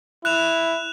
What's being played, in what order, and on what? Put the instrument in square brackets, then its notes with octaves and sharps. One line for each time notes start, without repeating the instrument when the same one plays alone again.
[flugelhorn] E4 [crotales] F#6 E7 F7